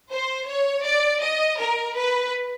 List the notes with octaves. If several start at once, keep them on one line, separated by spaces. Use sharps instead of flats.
C5
C#5
D5
D#5
A#4
B4